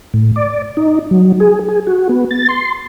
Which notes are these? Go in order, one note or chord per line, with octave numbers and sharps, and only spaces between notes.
A2
D5
D#4
F#3
G#4
G#4
F#4
B3
A6
C6